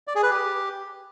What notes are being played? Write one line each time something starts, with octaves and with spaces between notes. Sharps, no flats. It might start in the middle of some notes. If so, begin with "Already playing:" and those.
D5
G#4
B4
G4